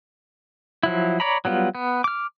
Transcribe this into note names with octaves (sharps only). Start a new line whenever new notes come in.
F3 F#3 E4
C#5 D5 A#5 B5
F#3 G3 B3 F4
B3
D6 F6